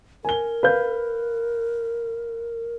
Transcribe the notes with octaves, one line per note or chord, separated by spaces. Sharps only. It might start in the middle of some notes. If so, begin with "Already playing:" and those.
A#4 G#5 G7
B4 F5 G6